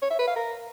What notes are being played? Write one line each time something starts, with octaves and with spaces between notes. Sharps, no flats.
C#5
E5
B4
F5
A#4